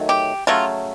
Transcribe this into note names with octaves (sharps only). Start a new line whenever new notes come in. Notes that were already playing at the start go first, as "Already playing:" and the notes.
Already playing: D#3 F#3 A3
G4
C#3 F#3 A3 F4